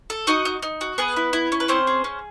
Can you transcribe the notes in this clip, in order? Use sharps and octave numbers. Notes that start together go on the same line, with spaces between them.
A4
D#4 F#4 D#5
D#4
D#4
F#4
B3 G#4 B4
E4
E4
C#4
B4
C4 C#4 C5
G#4
C#4